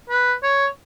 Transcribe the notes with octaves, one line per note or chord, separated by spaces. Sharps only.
B4
C#5